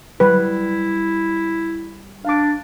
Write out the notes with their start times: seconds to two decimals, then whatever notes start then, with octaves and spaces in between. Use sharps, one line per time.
0.20 G3 E4 B4
2.25 D4 F5 D6